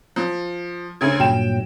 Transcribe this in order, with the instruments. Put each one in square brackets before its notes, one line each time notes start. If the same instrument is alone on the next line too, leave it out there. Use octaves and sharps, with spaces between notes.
[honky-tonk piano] F3
[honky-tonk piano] D2 C#3 [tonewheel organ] G#6
[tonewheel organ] G2 A#2 F#3 [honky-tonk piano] G5 E7